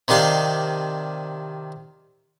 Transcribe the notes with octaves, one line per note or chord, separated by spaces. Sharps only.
C3 D#3 D4 F5 C6